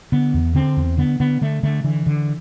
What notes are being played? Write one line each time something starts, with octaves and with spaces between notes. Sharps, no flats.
D3 B3
E2
D3 C4
E2
D3 B3
D3 B3
D3 A3
D3 A3
D3 E3
D3